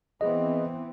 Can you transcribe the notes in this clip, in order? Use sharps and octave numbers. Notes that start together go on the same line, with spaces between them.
E3 B3 C4 G#4 D#5